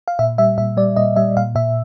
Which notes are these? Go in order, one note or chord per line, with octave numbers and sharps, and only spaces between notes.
F5
A#2 E5
G3 E5
A#2 E5
G3 D5
A#2 D#5
G3 E5
A#2 F5
A#2 E5